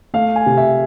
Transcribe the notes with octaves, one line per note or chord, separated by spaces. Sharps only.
A3 F5
G#5
C3
E5